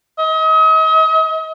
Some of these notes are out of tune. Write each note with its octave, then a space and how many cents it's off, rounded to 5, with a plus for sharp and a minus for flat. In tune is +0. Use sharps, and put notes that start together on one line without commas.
D#5 +40